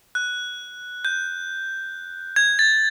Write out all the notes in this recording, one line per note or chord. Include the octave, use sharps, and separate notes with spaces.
F#6
G6
G#6
A6